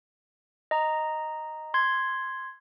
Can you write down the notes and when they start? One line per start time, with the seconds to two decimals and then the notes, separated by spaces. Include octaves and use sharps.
0.71 D#5 A#5
1.74 C6 G#6